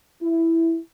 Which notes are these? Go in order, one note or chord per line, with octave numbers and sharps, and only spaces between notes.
E4